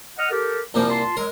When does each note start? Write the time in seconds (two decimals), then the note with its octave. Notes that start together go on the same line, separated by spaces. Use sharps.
0.18 D#5 F#5 F6
0.30 G4 A4 A#4
0.74 C2 A#2 F3 A#3
0.89 F4 A5 C6
1.17 F#3 G#3 A#4